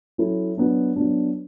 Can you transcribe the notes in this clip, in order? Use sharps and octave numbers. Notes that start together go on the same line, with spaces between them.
F#3 C#4 E4 A4
F#3 B3 D4
F#3 B3 D4